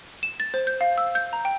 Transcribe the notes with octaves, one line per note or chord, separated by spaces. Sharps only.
E7
A6
C5
G6
F5
E6
G6
A#5
G5